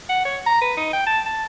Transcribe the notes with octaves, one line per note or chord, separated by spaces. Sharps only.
F#5
C#5
A#5
B4
D#4
G5
A5
A5